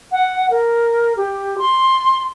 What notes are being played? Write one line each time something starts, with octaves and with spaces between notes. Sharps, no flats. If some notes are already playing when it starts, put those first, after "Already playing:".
F#5
A#4
G4
C6